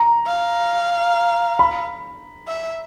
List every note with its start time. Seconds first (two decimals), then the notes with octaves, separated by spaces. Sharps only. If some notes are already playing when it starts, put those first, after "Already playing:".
Already playing: A#5
0.27 F5
1.59 B5
2.48 E5